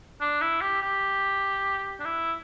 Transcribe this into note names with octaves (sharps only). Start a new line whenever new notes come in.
D4
E4
G4
G4
D4
E4